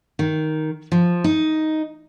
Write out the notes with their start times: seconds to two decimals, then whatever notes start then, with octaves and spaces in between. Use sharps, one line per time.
0.19 D#3
0.92 F3
1.24 D#4